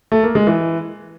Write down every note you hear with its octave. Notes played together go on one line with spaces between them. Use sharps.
A3
A#3
G#3
E3